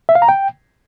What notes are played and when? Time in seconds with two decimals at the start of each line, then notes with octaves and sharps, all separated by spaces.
0.09 E5
0.15 F5
0.22 A#5
0.29 G5